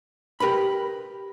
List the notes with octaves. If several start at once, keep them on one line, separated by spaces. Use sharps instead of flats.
G4 A#4 B4 B5